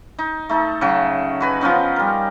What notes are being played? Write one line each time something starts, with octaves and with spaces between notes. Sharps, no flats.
D#4
A3 D#4 A4
C#3 F#3
F#4 B4 G#5
F3 B3 C#4 D#4
G3 A#4